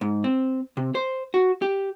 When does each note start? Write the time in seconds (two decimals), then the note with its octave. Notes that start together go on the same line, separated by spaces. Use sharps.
0.01 G#2
0.24 C4
0.77 C3
0.95 C5
1.34 F#4
1.62 G4